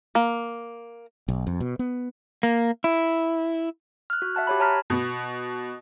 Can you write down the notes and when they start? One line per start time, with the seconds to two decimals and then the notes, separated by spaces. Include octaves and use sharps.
0.15 A#3
1.28 B1
1.47 F2
1.60 B2
1.79 B3
2.43 A#3
2.84 E4
4.10 F6 F#6
4.22 F#4
4.35 E5 F#5 A5 F#6
4.47 G4 C#5 B5
4.60 C#5 A5 A#5 F6 B6
4.90 B2 B3